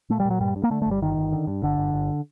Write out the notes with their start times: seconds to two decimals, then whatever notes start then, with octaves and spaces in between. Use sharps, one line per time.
0.10 A#2 A3
0.20 G3
0.25 A#2
0.30 F#3
0.41 G2 G3
0.56 G2
0.64 A#3
0.71 D3 A3
0.82 A3
0.86 G1
0.91 G3
1.02 G1 D#3
1.17 G1
1.33 D3
1.47 G2
1.63 G1 D3
1.78 G1
1.94 G1